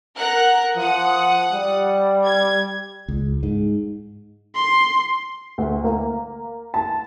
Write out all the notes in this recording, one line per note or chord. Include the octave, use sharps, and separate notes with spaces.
A#4 F#5 F#6
F3 F#5 D#6
G3
G#6
C#2
G#2
C6
D2
A#3
A5